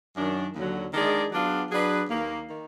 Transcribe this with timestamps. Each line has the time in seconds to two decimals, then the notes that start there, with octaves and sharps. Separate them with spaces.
0.16 F#2 D#3 F#3 D4
0.55 D#2 D3 F#3
0.94 D#3 G#3 D4 G#4 D5
1.32 F#3 B3 D4 F4 G#4
1.70 F#3 D4 G#4 B4
2.09 D#2 D#3 A#3
2.49 D#3